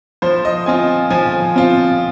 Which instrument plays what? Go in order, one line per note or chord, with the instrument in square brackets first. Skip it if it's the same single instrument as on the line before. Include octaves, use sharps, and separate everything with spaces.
[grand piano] F3 C5
D#5
C4 F4 G#5
F3 G#5
C4 F4